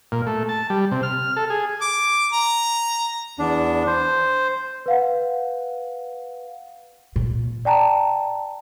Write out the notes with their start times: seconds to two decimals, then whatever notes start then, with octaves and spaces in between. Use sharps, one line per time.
0.12 A#2
0.27 A3
0.49 A5
0.70 G3
0.92 C3
1.03 F6
1.36 A4
1.50 G#4
1.82 D6
2.33 A#5
3.39 E2 D4
3.87 C5
4.86 B4 F5 F#5
7.16 A#2
7.65 D5 G5 A5 A#5